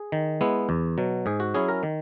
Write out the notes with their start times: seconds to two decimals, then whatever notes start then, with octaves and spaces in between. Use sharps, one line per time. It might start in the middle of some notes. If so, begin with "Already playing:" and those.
Already playing: G#4
0.12 D#3
0.41 G#3 B3 E4
0.69 E2
0.98 B2 F#3
1.26 G#2 G#4
1.40 F#4
1.54 F#3 C#4 E4 G#4
1.68 A#4
1.83 D#3